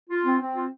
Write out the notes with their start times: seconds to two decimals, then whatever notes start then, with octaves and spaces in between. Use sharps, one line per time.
0.10 F4
0.25 C4
0.40 C4
0.56 F4